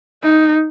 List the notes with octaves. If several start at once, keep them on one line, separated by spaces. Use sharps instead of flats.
D#4